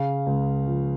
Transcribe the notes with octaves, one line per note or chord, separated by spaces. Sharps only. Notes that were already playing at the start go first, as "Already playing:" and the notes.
Already playing: C#3 F5
C#2
F3